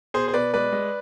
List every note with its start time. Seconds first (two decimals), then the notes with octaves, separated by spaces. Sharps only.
0.14 B2 G#4 C5
0.28 C5
0.34 B2 B4 D5
0.54 G#3 B4 D5
0.72 G#3